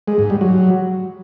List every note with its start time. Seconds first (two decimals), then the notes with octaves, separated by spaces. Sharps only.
0.08 G#3
0.19 G#2
0.30 G3
0.41 F#3